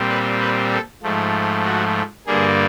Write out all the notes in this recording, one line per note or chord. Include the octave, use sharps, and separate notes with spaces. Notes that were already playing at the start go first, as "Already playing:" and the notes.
Already playing: A#2 G3 C4
B4
B4
A4
G#2 F3 A3
F#4
G2 D3 G3 A#3 G#4